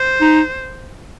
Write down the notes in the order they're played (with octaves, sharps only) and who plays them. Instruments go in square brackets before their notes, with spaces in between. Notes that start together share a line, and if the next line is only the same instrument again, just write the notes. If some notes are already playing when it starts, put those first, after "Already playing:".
Already playing: [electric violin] C5
[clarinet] D#4